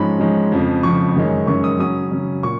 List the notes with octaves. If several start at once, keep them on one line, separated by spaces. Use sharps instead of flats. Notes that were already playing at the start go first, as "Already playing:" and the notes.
Already playing: G#2 F3 G#3 C#4 B5
G#2 F3 G#3 C#4
F2 C#3 F3
F2 C#3 F3 C#6
F#2 D#3 G#3 C#4
F#2 D#3 G#3 C#4 C#6
D#6
C#3 F#3 C#4 D#6
C#3 F#3 C#4
A#2 C#6